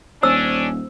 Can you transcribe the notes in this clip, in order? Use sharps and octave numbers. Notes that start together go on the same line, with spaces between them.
D#1 C#4 D4 C5 E6